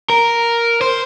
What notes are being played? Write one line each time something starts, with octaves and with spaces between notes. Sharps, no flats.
A#4
C5